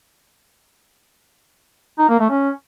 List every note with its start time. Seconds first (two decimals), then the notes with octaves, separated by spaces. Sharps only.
1.99 D#4
2.09 A#3
2.19 A3
2.30 C#4